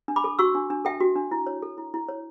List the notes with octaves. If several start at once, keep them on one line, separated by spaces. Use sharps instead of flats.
D4
B5 D6
A4
F#4 C#6 E6
D4
D4
A4 E5 G5
F#4
D4
E4
C#5
A4
E4
E4
C#5